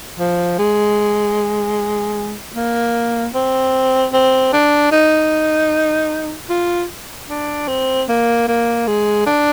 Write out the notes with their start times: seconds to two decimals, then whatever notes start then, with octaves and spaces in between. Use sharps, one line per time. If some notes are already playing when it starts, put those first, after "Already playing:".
0.19 F3
0.59 G#3
2.56 A#3
3.35 C4
4.13 C4
4.53 D4
4.92 D#4
6.50 F4
7.30 D4
7.68 C4
8.09 A#3
8.48 A#3
8.87 G#3
9.27 D4